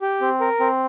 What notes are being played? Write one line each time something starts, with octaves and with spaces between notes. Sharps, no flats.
G4
C4
A#4
C4